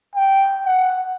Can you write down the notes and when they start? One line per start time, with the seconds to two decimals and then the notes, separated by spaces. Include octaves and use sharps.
0.15 G5
0.66 F#5